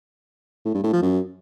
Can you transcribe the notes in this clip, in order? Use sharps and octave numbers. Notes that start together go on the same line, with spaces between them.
A2
G2
A2
F3
F#2